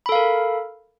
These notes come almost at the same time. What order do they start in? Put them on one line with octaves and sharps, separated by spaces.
B5 A4 F5 A#4